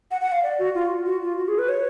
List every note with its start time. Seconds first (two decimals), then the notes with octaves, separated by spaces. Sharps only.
0.11 F#5
0.21 F#5
0.32 F5
0.43 D5
0.59 F#4
0.75 F4
1.06 F#4
1.22 F4
1.37 F#4
1.48 G#4
1.58 B4
1.69 C#5